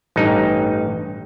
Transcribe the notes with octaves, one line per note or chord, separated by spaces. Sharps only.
A1 G2 D#4